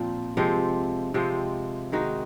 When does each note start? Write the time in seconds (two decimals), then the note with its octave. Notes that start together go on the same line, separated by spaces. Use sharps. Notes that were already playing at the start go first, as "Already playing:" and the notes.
Already playing: A#2 F3 C4 F4
0.37 C3 F3 G#3 C4
1.14 C3 F3 G#3 C4
1.92 D#3 G#3 D#4 F#4